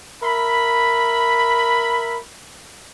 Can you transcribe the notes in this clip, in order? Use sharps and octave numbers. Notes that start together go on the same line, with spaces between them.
A#4 E5 B5